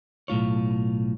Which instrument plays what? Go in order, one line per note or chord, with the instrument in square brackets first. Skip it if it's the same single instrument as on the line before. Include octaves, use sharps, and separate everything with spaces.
[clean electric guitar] B1 A2 F4 C#5